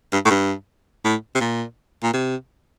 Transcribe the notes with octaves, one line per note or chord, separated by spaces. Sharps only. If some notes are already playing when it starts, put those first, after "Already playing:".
G2
A2
G2
A2
C3
A#2
A#2
C3